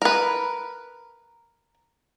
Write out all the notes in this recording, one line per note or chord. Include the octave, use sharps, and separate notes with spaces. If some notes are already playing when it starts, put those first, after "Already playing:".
A#4 B4